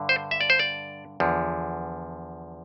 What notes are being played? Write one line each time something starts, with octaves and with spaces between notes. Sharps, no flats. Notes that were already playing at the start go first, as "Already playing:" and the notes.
Already playing: G2 D3
C5
E5
D5
C5
D5
E2 D3 F3